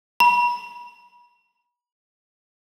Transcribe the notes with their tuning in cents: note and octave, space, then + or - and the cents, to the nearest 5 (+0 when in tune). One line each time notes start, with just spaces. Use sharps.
B5 -35